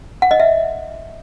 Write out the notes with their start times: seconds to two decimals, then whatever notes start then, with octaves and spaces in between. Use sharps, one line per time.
0.22 F#5
0.31 D#5
0.40 E5